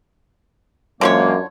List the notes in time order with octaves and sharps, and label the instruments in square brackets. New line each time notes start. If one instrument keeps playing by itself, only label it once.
[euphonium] F#2 [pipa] D3 F3 C#5 [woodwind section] E3 G#3 A#3